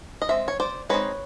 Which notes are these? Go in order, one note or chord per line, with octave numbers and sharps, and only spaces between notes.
D#5
G#3 C4 E5
C#5
C5 D5
G#3 C4 D#4 B4 C#5